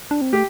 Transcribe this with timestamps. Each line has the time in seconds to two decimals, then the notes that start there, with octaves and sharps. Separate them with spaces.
0.11 D4
0.21 C4
0.33 A3 G4